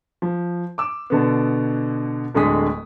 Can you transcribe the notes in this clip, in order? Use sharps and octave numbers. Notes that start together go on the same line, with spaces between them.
F3
D6 E6
B2 D3 B3
D1 D3 G#3 G#4 D#6 B6